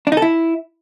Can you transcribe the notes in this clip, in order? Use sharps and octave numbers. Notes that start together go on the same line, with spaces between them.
D4
D#4
A4
E4